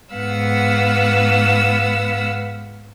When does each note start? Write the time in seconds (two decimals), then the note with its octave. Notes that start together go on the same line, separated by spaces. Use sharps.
0.14 G#2 B3 B4 F5 F#5 E6